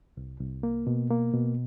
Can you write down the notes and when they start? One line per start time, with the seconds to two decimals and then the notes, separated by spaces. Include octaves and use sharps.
0.17 C2
0.40 C2
0.63 A#3
0.87 B2
1.10 A#3
1.34 B2